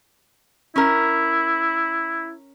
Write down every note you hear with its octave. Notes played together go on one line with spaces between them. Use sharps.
C#4 E4 A#4